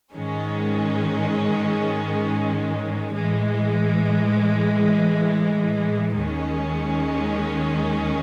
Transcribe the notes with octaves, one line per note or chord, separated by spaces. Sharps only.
G#2 D#3 G#3 C#4
A2 E3 G#3
D#2 D#3 G#3 C#4